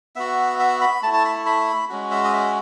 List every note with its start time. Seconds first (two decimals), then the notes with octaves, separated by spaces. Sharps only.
0.16 B3 F#4 E5
0.59 E5
0.81 B5
1.03 A3 A5
1.07 E4
1.13 A5
1.25 B5
1.46 B5
1.89 G#3 C#4 F#4
2.11 E5
2.24 D#5
2.33 E5